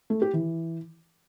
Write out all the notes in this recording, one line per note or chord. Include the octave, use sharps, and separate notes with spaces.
A3
G4
E3